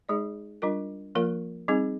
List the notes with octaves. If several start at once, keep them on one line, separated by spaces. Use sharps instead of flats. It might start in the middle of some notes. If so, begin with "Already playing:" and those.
G#3 D#4 G#4 D5
G3 D4 F4 A#4
F3 A#3 F4 A#4
G3 C4 D#4 G#4